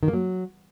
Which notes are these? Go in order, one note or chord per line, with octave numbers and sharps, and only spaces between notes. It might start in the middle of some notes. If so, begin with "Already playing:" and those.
D#3
A#3
F#3